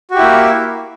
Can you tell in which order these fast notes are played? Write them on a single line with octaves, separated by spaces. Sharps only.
F#4 G4 E4 A#3